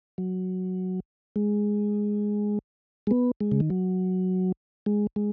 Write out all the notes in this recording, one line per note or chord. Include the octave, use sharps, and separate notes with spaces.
F#3
G#3
G#3
B3
G#3
C#3
D#3
F#3
G#3
G#3